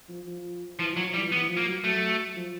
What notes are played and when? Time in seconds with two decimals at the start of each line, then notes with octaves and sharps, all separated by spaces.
0.09 F3
0.26 F3
0.79 E3 F3
0.92 F3
0.97 F#3
1.05 F3
1.14 G3
1.18 E3
1.32 E3 B3
1.49 F3
1.57 A#3
1.66 F#3
1.84 F#3 A3
2.36 F3